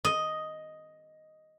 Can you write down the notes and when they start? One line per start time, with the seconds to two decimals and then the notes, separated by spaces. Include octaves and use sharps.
0.05 D#5